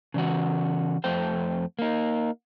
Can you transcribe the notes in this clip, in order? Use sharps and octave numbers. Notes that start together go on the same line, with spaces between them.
C#3 E3 F#4
F2 A3 C5 G5
A#3 D#4